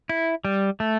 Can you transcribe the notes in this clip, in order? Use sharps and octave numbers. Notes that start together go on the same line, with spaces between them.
E4
G3
A3